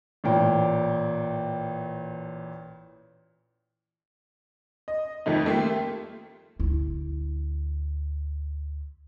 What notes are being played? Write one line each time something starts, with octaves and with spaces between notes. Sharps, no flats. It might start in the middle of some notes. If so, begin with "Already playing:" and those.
A1 A#2 G5
D#5
F2 D#3 A3 D#4
A3 A#3 F4 G4
D2 E4